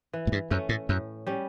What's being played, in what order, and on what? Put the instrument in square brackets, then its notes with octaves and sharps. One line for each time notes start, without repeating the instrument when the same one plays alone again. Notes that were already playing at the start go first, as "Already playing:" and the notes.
[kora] E3
[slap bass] A2
G2
[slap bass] F#2 [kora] A3 C#4
[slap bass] A2
[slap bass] F#2 [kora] A2
[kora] G3 C#4